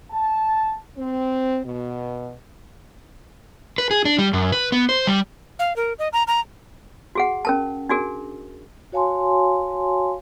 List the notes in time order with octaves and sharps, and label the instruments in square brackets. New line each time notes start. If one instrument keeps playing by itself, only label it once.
[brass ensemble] A5
C4
B2
[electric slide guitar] B4
G#4
D4
G3
F#2
B4
B3
C5
G3
[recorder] F5
A#4
D#5
A#5
A#5
[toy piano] F#4 G#4 F#5
C#4 A#4 A5
D4 F#4 G#4 A#4
[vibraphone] F#4 C#5 F5 G#5 A5 C6